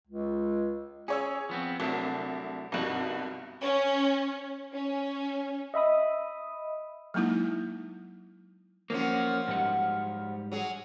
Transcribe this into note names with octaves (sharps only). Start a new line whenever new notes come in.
C#2
C#4 G#4 C#5 E6
F3 B3 C4
C2 F#3 A3 D4
C2 G2 B2 D#4 F#4
C#4
C#4
D#5 E5 B5 D#6
F#3 G#3 A#3 D#4 E4
F3 F#3 A#3 C4 C#4
G#2 G3 F#5
F#3 G#4